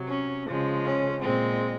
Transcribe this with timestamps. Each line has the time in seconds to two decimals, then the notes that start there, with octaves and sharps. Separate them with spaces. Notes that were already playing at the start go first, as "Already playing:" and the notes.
Already playing: C3 F#3
0.08 C#4
0.46 C#3 F3 G#3
0.85 C#4
1.22 A#2 G#3 C4